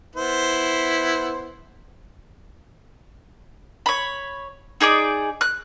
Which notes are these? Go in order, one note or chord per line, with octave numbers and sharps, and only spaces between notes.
B3 E4 C5
C#5 B5
D#4 G#4 D5 D6
F#6